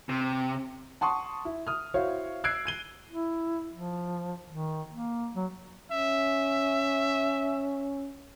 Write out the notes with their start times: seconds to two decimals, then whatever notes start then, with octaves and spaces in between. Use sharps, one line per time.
0.09 C3
1.01 F#5 A5 C6 C#6 D#6
1.45 E4
1.67 D#6 F6
1.94 E4 F#4 C5 C#5 F5
2.44 E6 F#6 G#6 C7 D7
2.65 G#6 D#7 G7
3.08 E4
3.73 F3
4.49 D#3
4.90 A#3
5.35 F#3
5.92 C#4 E5